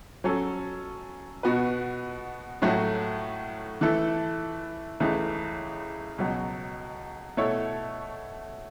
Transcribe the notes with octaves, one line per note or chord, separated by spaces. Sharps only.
F#3 C#4 A4
B2 B3 F#4 B4
A2 F#3 A3 F#4
E3 A3 E4 A4
C#2 C#3 E3 A3
C#2 B2 F#3
B2 A3 E4 A4 C#5